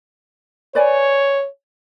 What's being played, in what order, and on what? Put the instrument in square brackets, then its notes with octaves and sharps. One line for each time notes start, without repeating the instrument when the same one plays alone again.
[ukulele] B4 D5 G#5 [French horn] C#5